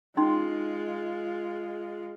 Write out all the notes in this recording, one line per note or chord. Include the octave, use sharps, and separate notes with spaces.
G#3 C#4 D#4 F4 C6